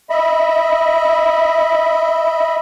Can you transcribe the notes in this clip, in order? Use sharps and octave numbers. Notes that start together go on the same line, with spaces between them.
D#5 E5 B5